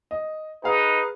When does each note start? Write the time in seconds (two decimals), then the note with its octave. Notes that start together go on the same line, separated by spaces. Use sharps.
0.11 D#5
0.64 D#4 G#4 B4 F5